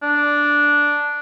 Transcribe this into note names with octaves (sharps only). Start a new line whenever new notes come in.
D4